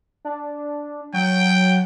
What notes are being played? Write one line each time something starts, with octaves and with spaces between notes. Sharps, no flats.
D4
F#3 G5